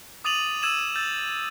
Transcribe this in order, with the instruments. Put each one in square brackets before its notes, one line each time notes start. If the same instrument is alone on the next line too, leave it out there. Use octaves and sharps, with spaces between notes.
[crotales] D6 D#6 A6 D#7 F7 F#7
E6 G#6 D#7 E7 F#7
E6 G6 A6